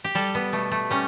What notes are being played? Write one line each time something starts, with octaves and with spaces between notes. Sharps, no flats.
G4
G3 A4
B3
B2 A3
A3
G3 C#4